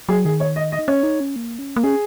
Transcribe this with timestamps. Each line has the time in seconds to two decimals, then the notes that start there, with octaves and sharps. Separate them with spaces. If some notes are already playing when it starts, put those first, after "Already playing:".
0.09 F#3 G#4
0.25 D#3 G#4
0.40 C#5
0.56 D#5
0.72 D#5
0.79 D#4
0.88 C#4 C#5
1.03 D#4
1.20 C#4
1.36 A#3
1.59 C#4
1.76 A#3
1.83 C#4 G#4